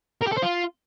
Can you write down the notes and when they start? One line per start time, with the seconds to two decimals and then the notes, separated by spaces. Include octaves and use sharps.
0.22 A#4
0.27 G4
0.33 A4
0.38 C5
0.43 F4